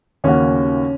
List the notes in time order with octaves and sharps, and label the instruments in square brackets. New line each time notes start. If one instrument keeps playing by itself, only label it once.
[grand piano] D#2 C#3 A#3 F#4 [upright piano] C#4